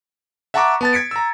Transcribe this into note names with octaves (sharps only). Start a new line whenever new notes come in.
E5 F#5 A5 A#5 C#6 D6
B3 A5 A6
G#6 B6 C#7 D7
A#5 E6